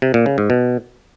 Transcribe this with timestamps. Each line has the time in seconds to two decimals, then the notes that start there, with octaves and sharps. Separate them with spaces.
0.02 C3
0.14 A#2
0.26 C#3
0.38 G#2
0.50 B2